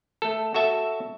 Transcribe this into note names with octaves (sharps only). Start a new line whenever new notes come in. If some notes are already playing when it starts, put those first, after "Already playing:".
A3 A4
F#4 A4 E5 A5